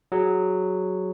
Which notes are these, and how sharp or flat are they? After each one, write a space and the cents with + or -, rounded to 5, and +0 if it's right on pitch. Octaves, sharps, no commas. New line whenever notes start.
F#3 +0 G#4 +0